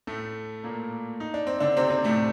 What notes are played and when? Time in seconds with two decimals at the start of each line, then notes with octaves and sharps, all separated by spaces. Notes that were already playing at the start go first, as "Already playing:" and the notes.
0.07 A2 A3
0.64 A#2 A#3
1.20 D#4
1.34 D4
1.47 C4
1.60 D3 D4
1.77 C3 C4
1.90 C3 C4
2.04 A2 A3